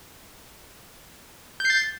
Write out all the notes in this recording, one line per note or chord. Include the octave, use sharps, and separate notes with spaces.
G6 A6 C7